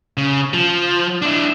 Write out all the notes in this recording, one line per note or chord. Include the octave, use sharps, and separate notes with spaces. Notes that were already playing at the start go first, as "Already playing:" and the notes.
C#3
F3
D4 E4